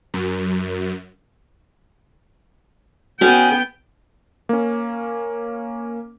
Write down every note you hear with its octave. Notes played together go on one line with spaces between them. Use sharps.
F#2
B3 C#4 F#4 G#4 G5
A#3 C#4